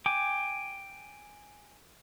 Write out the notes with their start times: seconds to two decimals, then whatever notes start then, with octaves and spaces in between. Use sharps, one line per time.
0.06 G5 G#5 D6